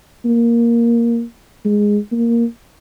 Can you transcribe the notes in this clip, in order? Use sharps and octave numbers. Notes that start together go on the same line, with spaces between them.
A#3
G#3
A#3